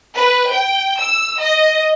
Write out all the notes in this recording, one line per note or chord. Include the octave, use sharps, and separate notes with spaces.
B4
G5
E6
D#5